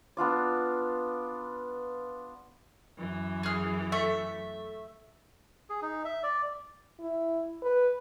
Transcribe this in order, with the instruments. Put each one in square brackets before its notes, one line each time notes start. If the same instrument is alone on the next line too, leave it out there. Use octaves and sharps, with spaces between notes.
[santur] B3 D4 F4 D5
[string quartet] F#2 E3
[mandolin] G#4 F6
A3 E5
[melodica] G#4
D#4
E5
D5
[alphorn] E4
B4